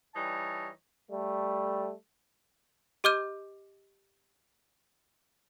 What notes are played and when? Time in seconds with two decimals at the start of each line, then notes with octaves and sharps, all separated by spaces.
0.15 E3 G3 D#4 C#5 A5
1.12 G3 A3
3.04 G4 D#5 D6 F6 G6 D#7